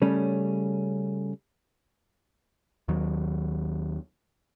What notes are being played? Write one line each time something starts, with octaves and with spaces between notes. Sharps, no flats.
C#3 G3 A3 C#4
D#2 D#3 F#3